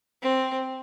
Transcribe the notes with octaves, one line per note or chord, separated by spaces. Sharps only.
C4